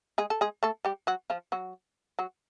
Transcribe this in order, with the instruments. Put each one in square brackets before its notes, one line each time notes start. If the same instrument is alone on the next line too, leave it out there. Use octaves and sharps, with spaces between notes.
[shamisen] G#3 G#4
A4
G#3 G#4
A3 A4
G3 G4
F#3 F#4
F3 F4
F#3 F#4
F#3 F#4